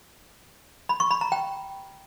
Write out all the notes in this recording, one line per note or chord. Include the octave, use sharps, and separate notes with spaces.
B5
C#6
B5
A#5
G5